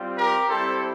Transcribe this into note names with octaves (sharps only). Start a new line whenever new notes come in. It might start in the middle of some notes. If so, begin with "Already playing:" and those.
Already playing: G3 C4 F4
G4 A#4
G3 C4 E4 G4 A4 C5